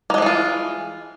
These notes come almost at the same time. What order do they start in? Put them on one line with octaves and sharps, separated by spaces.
A#3 G#3 F3 E3 F4